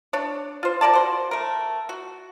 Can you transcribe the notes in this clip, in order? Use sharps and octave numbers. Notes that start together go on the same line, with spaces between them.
D4 C#5
F4 C5
B2 A#4 D5 A5
F#4 C5
A3 A#4
F#4